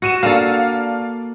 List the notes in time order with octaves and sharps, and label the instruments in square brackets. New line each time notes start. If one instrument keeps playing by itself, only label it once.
[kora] F#4 [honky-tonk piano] C#7 D#7 E7
[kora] A#3 A4 [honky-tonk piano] D4 F5